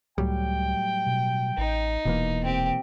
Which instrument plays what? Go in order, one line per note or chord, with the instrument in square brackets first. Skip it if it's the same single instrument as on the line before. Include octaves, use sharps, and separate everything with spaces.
[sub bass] C#2 [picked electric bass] A2 F#3 G3 [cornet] G5
[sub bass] B2
[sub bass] A1 [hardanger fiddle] D#4
[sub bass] D#1 [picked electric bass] B2 E3 A#3
[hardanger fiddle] C4 G4